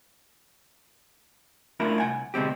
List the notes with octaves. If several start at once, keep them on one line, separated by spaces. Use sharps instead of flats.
A3 D4 E4 F4 A#4
C2 F#5 G#5
D2 B2 G#3 C4 G4